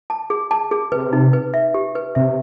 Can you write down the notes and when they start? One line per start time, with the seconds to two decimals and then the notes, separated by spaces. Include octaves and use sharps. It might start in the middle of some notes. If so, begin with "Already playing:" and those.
0.10 A5
0.30 G#4
0.51 A5
0.71 G#4
0.92 C3 B4
1.13 D#4
1.33 B4
1.54 E5
1.74 G4
1.95 B4
2.15 C3 E5